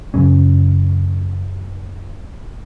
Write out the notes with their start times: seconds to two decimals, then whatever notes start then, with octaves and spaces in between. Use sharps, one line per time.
0.14 F#2 C#3 F#3 C#4